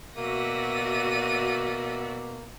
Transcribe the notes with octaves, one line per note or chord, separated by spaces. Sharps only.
B2 A#3 F#4 D5 E5 A#6 D#7